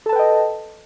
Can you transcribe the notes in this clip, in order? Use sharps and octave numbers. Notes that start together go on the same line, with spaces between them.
A4 B4 D#5 G5 A5